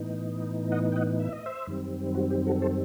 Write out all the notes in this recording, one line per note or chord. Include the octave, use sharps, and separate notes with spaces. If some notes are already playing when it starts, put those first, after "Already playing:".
Already playing: A2 E3 B3 D#4
D#5 F#5
G5
D#5 F#5
E5
D#5
C5 E5
F#2 D#3 G3 C4
F#4
G4
F#4 A4
A4 C5